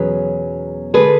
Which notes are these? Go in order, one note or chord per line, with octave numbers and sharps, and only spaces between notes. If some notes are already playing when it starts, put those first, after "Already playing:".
Already playing: E2 B2 F#3 C#4 G#4 B4
D3 G#3 D4 G#4 A4 B4